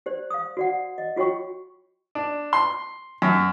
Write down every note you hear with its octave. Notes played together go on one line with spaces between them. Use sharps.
G4 C5 D5
F5 D#6
F#4 D5 F#5
D#5
F4 F#4 C#5 G5 C#6
D4
C6
F#2